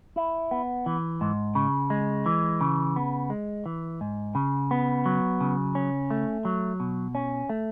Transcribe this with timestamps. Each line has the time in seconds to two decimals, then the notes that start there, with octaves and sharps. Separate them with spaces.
0.16 E4
0.51 B3
0.86 E3
1.21 G#2
1.55 C#3
1.90 G#3
2.26 E3
2.61 C#3
2.96 B3
3.30 G#3
3.66 E3
4.01 G#2
4.35 C#3
4.71 B3
5.06 F#3
5.41 C#3
5.75 C#4
6.11 A3
6.45 F#3
6.80 B2
7.15 C#4
7.49 A3